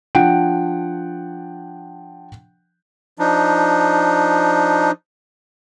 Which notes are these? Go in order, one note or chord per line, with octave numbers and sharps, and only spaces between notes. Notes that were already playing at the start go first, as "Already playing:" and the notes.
F3 D4 F#5 G5 D7
F3 D4 D#4